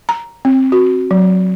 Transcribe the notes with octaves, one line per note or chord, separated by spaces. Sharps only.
A#5
C4
F#4
F#3